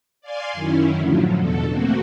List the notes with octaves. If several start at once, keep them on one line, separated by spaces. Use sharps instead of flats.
D5 F5 G#5 C6
F#2 D#3 C#4 E4
A2 D3 F3 F#3
E2 B2 D3 A4
A3 A#3 C4 F#4